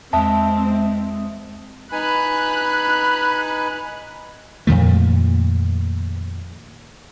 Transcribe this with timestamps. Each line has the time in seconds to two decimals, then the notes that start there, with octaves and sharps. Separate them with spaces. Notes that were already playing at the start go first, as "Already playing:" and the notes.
0.13 E2 G#3 C4 E5 A5 D#6
1.92 D#4 B4 G#5 B5 F#6
4.67 F2 A#2 D#3 A3